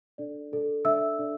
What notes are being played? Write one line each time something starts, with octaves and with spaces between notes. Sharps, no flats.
D4 A4 D5
D4 A4 D5
D4 A4 D5 E5 E6
D4 A4 D5